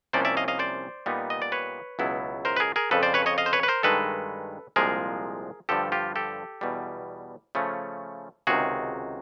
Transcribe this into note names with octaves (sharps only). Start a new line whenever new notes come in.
C2 C3 F3 A#3 C#4 C5 D5
D5 E5
D#5 F5
D#5 F5
C5 D5
A#2 G3 B3 D#4
D#5
D5
B4 C#5
C#2 B2 F#3 B3 E4
A#4 C5
B4
G#4 A#4
G#4 A#4
F2 C#3 F3 A4 B4
C5 D5
B4 C#5
C#5 D#5
D#5 F5
C5
B4 C#5
B4
A#4 C5
G2 D#3 G#3 A4 B4
C2 A#2 F3 G#3 G#4 A#4
G2 D3 F3 G4 A4
F4 G4
G4 A4
E2 B2 G3
C#3 F3 A3 C#4
C#2 C3 D#3 F#4 G#4